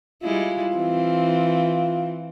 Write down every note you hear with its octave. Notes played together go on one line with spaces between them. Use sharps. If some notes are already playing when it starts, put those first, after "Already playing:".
G3 G#3 E4 F4
E3 C4